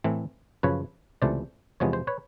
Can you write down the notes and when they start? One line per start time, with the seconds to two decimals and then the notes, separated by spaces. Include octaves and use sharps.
0.04 A2 E3 A3 C4
0.63 F#2 C#3 F3 B4 C#5
1.22 C#2 C3 E3 A3 C5 D5
1.80 E2 C3 F3 G#3 B3 C#5
1.93 C5
2.07 B4 C#5